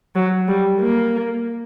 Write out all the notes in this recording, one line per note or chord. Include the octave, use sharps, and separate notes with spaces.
F#3
G3
A#3